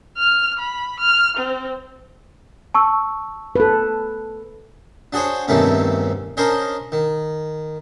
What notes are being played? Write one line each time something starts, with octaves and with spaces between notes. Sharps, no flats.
F6
B5
F6
C4
A5 C#6 E6
A4 B4
D4 F#4 G#4 C5 C#5
E2 G2 C3 D#3 A3 C#4
C#4 D4 A#4 C5 D#5 C6
D#3